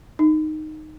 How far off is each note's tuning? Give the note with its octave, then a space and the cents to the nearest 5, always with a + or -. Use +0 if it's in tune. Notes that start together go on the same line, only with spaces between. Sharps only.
D#4 -10